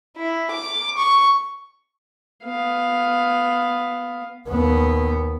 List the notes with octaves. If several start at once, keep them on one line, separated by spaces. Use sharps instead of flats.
E4
D6
C#6
B3 F5
D#2 B3